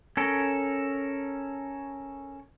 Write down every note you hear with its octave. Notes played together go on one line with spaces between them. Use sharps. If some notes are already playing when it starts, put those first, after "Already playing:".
C#4 A4 A#4